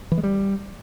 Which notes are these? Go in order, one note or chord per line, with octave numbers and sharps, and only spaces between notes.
E3
G#3
G3